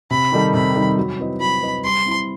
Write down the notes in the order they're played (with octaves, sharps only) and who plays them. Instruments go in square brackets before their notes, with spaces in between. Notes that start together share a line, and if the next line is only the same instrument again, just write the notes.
[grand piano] C3 [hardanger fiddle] B5
[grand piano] D#3 G3 D#4 A4
[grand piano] C3 [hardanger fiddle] B5
[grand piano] D#3 G3 D#4 A4
F#3
C4 E4 B4 D#5
[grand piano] F#3 [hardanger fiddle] B5
[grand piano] C4 E4 B4 D#5
[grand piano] G3 [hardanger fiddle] C6
[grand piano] C4 E4